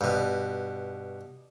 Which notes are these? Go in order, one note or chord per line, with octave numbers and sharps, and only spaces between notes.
G2 B2